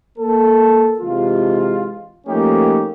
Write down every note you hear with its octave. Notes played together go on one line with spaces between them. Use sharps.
A#3 A4
C3 E3 G#3 F4
F3 A3 A#3 C#4 D#4 G4